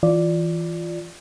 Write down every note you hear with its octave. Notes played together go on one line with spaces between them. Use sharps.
E3 F4 D5